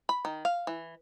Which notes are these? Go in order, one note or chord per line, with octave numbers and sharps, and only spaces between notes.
B5
D#3
F5
E3